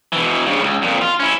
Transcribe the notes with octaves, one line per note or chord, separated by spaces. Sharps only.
B2 E3
G2 C#3
C#2
F2 A#2
F4
C#4 E4